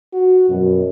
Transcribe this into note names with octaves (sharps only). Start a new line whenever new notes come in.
F#4
F#2 B2